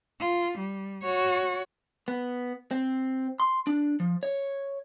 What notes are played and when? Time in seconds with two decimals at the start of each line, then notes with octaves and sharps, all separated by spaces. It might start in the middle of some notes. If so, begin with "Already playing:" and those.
0.21 F4
0.58 G3
1.03 F#4 C#5
2.08 B3
2.71 C4
3.40 C6
3.67 D4
4.00 F3
4.23 C#5